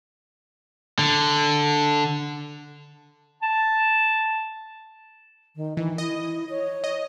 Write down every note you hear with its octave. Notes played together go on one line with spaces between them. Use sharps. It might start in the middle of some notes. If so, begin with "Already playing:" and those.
D3
A5
D#3
D#3 E3
E4 D#5
C#5
D#5